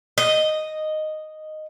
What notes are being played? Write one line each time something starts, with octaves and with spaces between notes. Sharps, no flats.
D#5